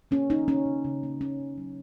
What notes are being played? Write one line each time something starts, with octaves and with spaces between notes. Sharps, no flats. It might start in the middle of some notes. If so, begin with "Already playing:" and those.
A#3 C#4
A#3 D#4
A#3 C#4
C#3
C#3
A#3
A#3 C#4
C#3
F#3